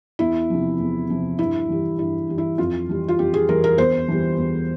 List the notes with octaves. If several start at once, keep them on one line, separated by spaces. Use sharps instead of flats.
E2 E4
C3 F3
E2
C3 F3
G2 E4
E3 G3
G2 E4
E3 G3
E4
F2 F4
E3 G3
F4
F2 G4
G#4
E3 G3 A#4
A#4
E2 C5
E3 G3
E2